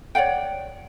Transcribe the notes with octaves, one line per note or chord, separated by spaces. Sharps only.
C#5 D5 F#5 G5